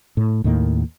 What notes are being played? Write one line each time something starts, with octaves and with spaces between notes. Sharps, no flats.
A2
D#2 A2 D#3 A#3